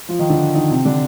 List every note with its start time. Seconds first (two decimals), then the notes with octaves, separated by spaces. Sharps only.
0.09 F3 F4
0.19 D#3 D#4
0.30 D3 D4
0.55 D#3 D#4
0.70 C3 C4
0.85 D3 D4